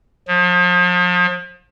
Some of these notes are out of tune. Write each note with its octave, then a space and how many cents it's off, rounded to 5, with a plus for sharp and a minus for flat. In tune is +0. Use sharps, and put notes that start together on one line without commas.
F3 +40